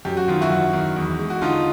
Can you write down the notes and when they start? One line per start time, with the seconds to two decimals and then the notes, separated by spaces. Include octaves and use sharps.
0.05 F#2 G4
0.17 F#4
0.28 D#3 F4
0.41 E4 F#4
0.50 F#2
0.73 D#3
0.96 E2
1.19 G#3
1.30 F#4
1.41 D3 D#4 F4